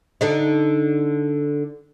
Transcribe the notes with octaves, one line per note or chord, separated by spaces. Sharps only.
D3 D4 D#4